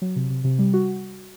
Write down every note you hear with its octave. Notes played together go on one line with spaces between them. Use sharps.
F#3
C3
C3
C3
G3
F#4